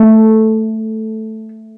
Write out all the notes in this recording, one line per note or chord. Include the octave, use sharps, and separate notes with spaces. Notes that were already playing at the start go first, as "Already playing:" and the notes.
Already playing: A3